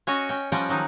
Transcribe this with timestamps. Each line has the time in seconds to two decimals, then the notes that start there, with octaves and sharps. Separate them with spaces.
0.07 C#4 F#4 C#5 D#5
0.29 C#4 G5
0.52 F3 G3 C#4 D#5 F#5 G5
0.69 D#3 F#3 D#4